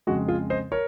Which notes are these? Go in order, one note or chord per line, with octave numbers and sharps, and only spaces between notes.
F2 C#3 G#3 F#4
F4 G#4
C5 D#5
A#4 C#5